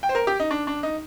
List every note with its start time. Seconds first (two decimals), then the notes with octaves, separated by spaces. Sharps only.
0.03 G5
0.09 C5
0.15 A#4
0.27 G4
0.40 D#4
0.51 D4
0.67 D4
0.83 D#4